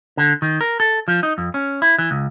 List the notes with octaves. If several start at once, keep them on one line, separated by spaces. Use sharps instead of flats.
D3
D#3
A#4
A4
F3
D#4
F2
C#4
E4
E3
C#2